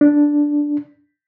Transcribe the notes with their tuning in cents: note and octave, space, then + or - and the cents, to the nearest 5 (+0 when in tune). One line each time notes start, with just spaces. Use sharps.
D4 -5